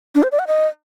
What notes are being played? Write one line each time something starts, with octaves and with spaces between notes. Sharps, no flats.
D4
C5
D5
F#5
D#5